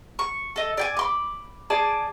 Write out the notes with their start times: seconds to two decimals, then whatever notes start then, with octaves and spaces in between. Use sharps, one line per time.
0.19 C#6
0.56 A4 D#5
0.77 D5 G5 G#5
0.97 B5 C6 D6
1.70 G#4 D5 G#5 A5